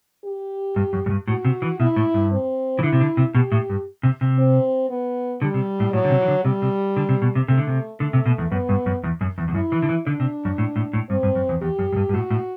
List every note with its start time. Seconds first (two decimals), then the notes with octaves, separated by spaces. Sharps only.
0.24 G4
0.76 G2
0.93 F#2
1.06 F#2
1.10 G2
1.28 A2 F#4
1.45 C3
1.62 E3
1.80 B2 E4
1.96 A2
2.14 G2
2.32 C4
2.79 E3
2.82 D3 E4
2.93 C3
3.00 D3
3.17 C3
3.35 B2 G4
3.52 A2
3.70 G2
4.03 C3
4.21 C3
4.38 C4
4.89 B3
5.42 D3 G3
5.54 C3
5.80 A2
5.93 A2 F#3
6.04 D3
6.10 C3
6.21 E3
6.28 D3
6.44 C3 G3
6.62 C3
6.97 D3
7.09 C3
7.22 B2
7.35 C3
7.48 C3 A3
7.58 D3
7.67 C3
8.00 D3 A3
8.13 C3
8.26 B2
8.38 E2
8.51 F#2 B3
8.69 G2
8.86 F#2
9.04 E2
9.21 F#2
9.38 E2
9.48 E2
9.54 F#2 E4
9.72 E3
9.82 D3
9.89 E3
10.07 D3 D4
10.20 C3
10.45 F#2
10.58 A2
10.76 A2
10.93 A2
11.09 G2 C4
11.23 G2
11.35 F#2
11.49 E2
11.62 E2 G4
11.79 F#2
11.92 F#2
11.97 G2
12.09 G2
12.13 A2 F#4
12.31 A2